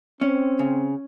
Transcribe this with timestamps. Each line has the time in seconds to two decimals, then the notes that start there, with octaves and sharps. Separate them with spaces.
0.21 C4 C#4
0.59 C#3